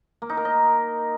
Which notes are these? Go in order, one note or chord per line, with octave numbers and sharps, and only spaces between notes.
A#3
D#4
A#4
D#5